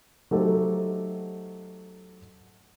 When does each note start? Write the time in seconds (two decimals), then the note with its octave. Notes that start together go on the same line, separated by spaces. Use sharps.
0.31 F#3 A3 D#4 G4 A4 C5